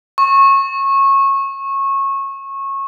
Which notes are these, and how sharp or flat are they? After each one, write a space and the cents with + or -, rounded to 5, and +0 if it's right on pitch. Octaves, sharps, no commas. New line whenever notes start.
C#6 -20